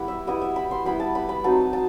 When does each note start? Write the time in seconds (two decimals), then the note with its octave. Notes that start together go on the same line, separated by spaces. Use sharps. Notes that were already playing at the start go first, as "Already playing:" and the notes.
Already playing: G3 B3 E4 G4 B5
0.08 E5
0.27 G3 B3 E4 D#5
0.42 E5
0.56 B5
0.71 C6
0.85 G3 B3 E4 B5
1.00 A5
1.15 B5
1.29 B5
1.44 F#3 C4 D#4 A5
1.73 A5